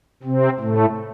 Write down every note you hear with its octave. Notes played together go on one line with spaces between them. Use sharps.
C3 C4
A2 A3